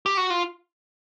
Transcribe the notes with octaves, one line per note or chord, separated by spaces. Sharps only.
G4
F#4
F4